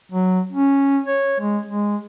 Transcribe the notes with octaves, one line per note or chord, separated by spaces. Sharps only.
F#3
C#4
C#5
G#3
G#3